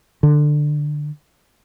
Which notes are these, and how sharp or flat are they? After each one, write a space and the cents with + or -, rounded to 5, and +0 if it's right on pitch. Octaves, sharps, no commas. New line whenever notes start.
D3 +15